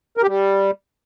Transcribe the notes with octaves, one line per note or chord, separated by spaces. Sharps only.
A#4
G4
G3